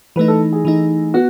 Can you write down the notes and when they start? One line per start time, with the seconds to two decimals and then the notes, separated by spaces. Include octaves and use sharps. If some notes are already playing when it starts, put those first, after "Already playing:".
0.16 E3 A3 D#4 B4
0.28 A4
0.53 G#4
0.65 E3 A3 D#4
1.14 B3 F#4